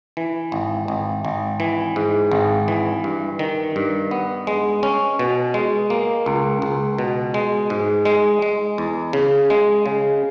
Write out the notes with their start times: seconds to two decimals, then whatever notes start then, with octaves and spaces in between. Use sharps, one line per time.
0.17 E3
0.52 G#1
0.88 G#1
1.25 G#1
1.60 E3
1.96 G#2
2.31 G#1
2.68 E3
3.04 G2
3.39 D#3
3.76 G2
4.11 B3
4.47 G#3
4.83 C#4
5.19 B2
5.54 G#3
5.90 A#3
6.26 C#2
6.62 C#2
6.98 B2
7.34 G#3
7.70 G#2
8.05 G#3
8.42 G#3
8.78 E2
9.13 C#3
9.50 G#3
9.86 C#3